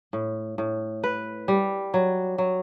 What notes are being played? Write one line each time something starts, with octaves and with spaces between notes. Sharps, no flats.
A2
A2
B4
G3
F#3
F#3